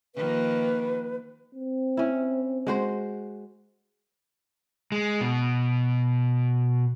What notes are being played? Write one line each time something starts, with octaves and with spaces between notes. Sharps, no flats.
D#3 F3 A#3 B4
C4
C#4 E4
G#3 F#4 C5
G#3
B2